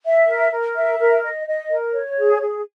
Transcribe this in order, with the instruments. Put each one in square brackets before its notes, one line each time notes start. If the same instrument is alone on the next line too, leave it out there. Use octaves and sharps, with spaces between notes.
[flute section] E5
A#4
A#4
E5
A#4
D#5
D#5
A#4
C#5
G#4
G#4